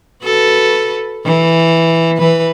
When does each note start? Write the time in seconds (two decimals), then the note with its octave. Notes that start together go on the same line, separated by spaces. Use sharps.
0.23 F#4 A4 B4
1.25 E3
2.17 E3 B4